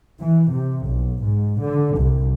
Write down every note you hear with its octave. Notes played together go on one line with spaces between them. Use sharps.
E3
C3
B1
G#2
D3
C2